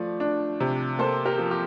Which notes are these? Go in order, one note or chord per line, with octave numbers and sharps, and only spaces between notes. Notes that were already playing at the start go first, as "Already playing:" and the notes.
Already playing: F3 A3 D5
D4
C3
A#3 A4 C5
G4 A#4
F3
G4